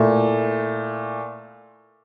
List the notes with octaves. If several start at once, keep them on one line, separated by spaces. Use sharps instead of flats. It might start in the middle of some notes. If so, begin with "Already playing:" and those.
Already playing: A#2 A3 E4